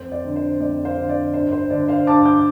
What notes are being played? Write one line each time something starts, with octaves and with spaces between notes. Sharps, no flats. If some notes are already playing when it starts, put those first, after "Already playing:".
Already playing: F2 C5
D5
D3
C5
F2 D5
C5 F5
D3
D5
G2 C5
C5
D3 D5
C5 F5
G2 A5 D6
D6 G6